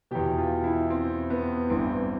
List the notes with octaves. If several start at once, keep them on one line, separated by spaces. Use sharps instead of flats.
E2 B2 G4
F4
E4
C4
B3
A1 G2 E3 C4